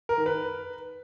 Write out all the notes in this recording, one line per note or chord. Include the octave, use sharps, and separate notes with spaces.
A#4
D#3
B4